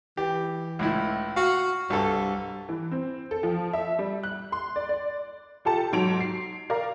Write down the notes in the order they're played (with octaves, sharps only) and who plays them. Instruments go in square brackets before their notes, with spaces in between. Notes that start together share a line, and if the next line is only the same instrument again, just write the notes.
[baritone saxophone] E3 [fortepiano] G4
[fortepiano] C#2 A2 E4
[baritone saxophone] F#4 [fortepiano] F5
[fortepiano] C2 A4 [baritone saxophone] G2
[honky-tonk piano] E3
C4
A4
F3
E5
G3
F#6
C6
D5
D5
F4 G4 A4 A5
G#2 F#3 D7 F7
C7
A#4 D5 F5 A#5